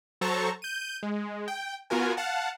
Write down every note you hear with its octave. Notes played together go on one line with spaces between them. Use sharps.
F#3 A4 C5 A5 A#5 C#6
G6 D#7
G#3
G5
B3 F4 F#4 A#4 G#5
F5 F#5 A5